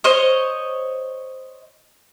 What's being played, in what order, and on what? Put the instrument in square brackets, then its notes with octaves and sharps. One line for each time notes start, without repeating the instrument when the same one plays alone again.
[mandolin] C5 C#5 D#5